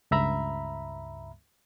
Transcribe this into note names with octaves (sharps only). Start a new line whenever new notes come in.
C#2 G2 E5 A#5 B5